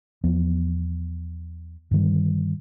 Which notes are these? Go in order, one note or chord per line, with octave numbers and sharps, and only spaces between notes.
E2 F3 B3
G2 D3 D#3 G3